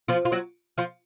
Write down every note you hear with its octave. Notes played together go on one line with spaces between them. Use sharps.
F3 F4
F4
F#3 F#4
F3 F4